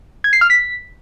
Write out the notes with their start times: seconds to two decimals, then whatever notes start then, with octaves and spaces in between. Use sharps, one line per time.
0.24 G#6
0.33 C7
0.41 F6
0.50 B6